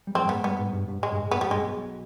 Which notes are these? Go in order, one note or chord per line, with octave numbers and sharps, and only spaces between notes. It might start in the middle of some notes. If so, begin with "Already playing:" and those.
G3
F2 F3 C4
G2 G3 B3
G#2 G#3
G2 G3 B3
G#2
G2
G2
G#2 G#3
G2
G#2
G2 B3
F2 G3
G2 G#3
B1 B2